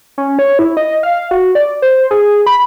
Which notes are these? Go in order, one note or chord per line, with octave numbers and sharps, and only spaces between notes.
C#4
C#5
E4
D#5
F5
F#4
D5
C5
G#4
B5